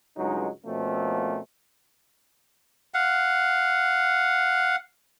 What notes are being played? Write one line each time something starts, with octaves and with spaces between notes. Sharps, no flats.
C#2 G2 F#3 G#3 D#4
B2 F3 A3 A#3 C4 C#4
F5 F#5